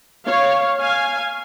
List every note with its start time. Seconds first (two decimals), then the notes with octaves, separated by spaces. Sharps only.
0.26 C#5 F5
0.80 F5 G#5